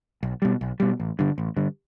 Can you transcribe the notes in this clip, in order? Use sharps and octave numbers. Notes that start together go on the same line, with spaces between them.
B1
B2 G3
B1
B2 G3
A1
G2 D3
A1
G2 D3